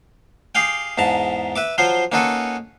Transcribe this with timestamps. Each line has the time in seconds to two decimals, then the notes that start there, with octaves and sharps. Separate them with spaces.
0.55 G4 G#4 F5 G5
0.98 E2 G#2 A5 A#5
1.56 B4 E5 D6
1.78 F3 F#3 F4 C5
2.12 A#3 C#4 D#4 F#4 A4 B4